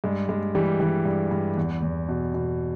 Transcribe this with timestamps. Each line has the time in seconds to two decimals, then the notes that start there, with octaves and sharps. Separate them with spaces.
0.04 G2 G#3
0.29 G2 G#3
0.55 E3 G3
0.80 E3 G3
1.05 G2
1.31 G2
1.57 E2
1.83 E2
2.09 B2
2.34 B2